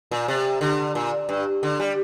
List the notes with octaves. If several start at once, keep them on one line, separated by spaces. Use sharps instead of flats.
A#2
C3
D3
A#2
G2
D3
G3